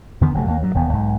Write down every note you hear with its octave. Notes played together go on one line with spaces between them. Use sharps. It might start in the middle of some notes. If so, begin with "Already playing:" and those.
E2 D3 D#3 B3
F#1 C3 F#3 A3
D#2 A#3
G2 F#3
E1 D#2 B3
B1 G#2